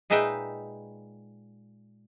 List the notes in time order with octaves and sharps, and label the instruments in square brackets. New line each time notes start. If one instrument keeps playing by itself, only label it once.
[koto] A#2 G#3 D#4 B4 E5 G5